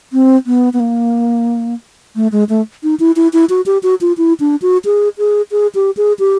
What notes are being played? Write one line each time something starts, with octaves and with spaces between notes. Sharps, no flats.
C4
B3
B3
A#3
A3
G#3
A3
D#4
E4
E4
E4
F#4
G4
F#4
F4
E4
D4
F#4
G#4
G#4
G#4
G4
G#4
G4